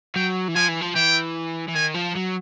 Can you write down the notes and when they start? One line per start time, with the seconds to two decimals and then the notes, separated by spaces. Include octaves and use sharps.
0.16 F#3 G5
0.48 E3
0.55 F3 G#5
0.69 E3
0.81 F3
0.95 E3 G5
1.68 E3
1.75 D#3 G#5
1.94 F3
2.15 F#3